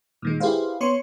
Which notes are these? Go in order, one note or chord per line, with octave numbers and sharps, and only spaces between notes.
A#2 D#3 G#3
E4 G4 G#4 B4 C5 F5
B3 C#5 C6 C#6 C#7